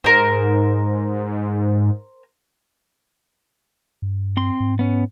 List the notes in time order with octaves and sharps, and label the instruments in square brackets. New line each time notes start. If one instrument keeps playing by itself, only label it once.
[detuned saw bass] G#2 [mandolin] A#4 C5
[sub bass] G2
[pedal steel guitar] C4 C6
[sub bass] G#2
[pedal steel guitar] B3 C#4